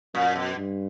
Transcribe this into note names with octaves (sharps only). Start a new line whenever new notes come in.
F#2 A#2
B2
G2